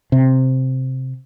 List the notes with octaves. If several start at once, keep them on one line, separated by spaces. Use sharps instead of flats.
C3